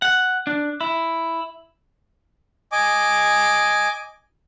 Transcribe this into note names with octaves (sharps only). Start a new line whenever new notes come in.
F#5
D4
E4
D#5 G#5 D6